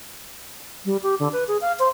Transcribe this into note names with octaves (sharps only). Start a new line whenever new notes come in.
G3
G4
D3
B4
G#4
F5
C5